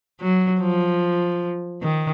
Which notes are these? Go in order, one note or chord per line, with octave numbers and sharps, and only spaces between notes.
F#3
F3
D#3